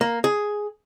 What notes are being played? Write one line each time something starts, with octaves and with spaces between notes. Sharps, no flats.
A#3
G#4